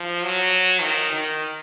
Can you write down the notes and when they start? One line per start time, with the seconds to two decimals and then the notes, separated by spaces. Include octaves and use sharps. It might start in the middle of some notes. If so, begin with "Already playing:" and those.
Already playing: F3
0.23 F#3
0.82 D#3
1.12 D#3